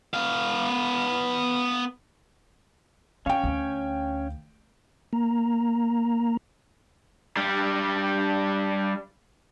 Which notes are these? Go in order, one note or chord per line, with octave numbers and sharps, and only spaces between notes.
B3 F5
C#4 D4 C#5 F5 G5
D2
A#3 A#5
G3 D4